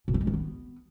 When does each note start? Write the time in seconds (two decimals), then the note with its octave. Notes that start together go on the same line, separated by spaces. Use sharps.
0.08 B2
0.14 C4
0.21 G#3
0.27 D#3
0.34 B3